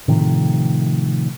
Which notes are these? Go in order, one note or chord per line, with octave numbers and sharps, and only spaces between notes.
A2 C3 D#3 F3